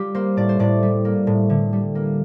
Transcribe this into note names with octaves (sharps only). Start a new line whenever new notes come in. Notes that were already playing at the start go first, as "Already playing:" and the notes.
Already playing: G3 F4 G4
A#3 C5
A2 D5
C5
A2 D5
G3
A#3
A2
D3
G3
A#3